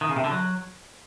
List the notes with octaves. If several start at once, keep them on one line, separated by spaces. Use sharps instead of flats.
D#3
C#3
C3
D3
F#3